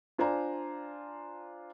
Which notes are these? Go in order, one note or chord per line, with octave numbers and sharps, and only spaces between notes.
D4 F4 C5 D5 G#5 A#5